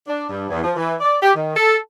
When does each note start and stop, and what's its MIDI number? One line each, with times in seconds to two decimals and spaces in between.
0.07 0.24 62
0.29 0.44 43
0.49 0.63 40
0.63 0.73 53
0.76 0.94 52
1.00 1.15 74
1.21 1.31 67
1.34 1.54 51
1.55 1.76 69